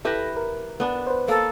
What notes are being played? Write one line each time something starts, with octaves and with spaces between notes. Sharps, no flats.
E4 G4 A4 B4 A#6
A#4
B3 D4
B4 C5
A#3 A4